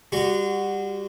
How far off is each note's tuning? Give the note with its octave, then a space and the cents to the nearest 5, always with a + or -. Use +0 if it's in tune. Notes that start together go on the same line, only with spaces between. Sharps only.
G3 +20 F#4 +0 C6 -35